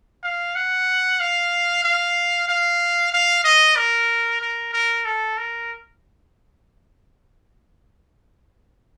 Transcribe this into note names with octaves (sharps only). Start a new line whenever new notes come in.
F5
F#5
F5
F5
F5
F5
D#5
A#4
A#4
A#4
A4
A#4